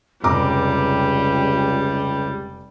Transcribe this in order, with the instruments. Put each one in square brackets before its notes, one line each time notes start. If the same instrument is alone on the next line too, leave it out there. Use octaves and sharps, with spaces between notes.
[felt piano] F1 A#5 D6 [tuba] C#2 [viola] G3 [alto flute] G4